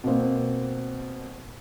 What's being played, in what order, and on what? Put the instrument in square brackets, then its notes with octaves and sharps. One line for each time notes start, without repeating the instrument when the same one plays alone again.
[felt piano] B2 A#3 C4